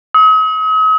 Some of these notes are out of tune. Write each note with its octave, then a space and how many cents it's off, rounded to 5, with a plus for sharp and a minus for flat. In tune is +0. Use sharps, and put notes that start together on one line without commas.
D#6 +45